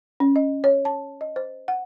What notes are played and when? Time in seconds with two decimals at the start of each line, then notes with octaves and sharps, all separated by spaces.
0.20 C#4
0.36 D#5
0.64 C#5
0.85 A5
1.21 D#5
1.36 C5
1.68 F#5